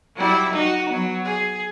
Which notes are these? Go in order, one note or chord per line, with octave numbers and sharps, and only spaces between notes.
F#3 G3 E4
D#4 F#4
F#3 B3
G#4